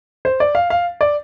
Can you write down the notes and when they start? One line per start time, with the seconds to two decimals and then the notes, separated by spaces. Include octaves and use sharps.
0.25 C5
0.40 D5
0.55 F5
0.70 F5
1.01 D5